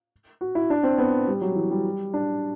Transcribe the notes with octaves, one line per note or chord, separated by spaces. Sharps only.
F#4
E4
D4
C4
B3
G3
F#3
E3
G3
D4